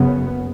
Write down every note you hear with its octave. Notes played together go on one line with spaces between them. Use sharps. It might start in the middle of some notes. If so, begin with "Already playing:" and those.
Already playing: F#1 F#2 C#3 B3